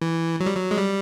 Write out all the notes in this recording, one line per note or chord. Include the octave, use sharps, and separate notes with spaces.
E3
F#3
G3
F#3
G#3
G3